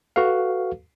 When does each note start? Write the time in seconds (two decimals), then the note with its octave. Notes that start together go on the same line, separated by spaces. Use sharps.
0.16 F#4 A4 B4 F5